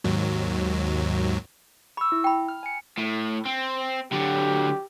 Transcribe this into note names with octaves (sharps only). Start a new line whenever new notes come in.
D#2 G#2 F#3
B5 C#6 E6
E4
G5 B5
F6
G#5 C#7
A2
C4
D3 F#3 G4